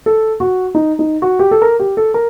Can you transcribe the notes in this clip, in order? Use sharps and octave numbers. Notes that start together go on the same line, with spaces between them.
A4
F#4
D#4
D#4
F#4
G4
A4
A#4
G4
A4
A#4